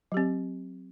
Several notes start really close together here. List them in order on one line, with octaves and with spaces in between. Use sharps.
F#3 G4 C4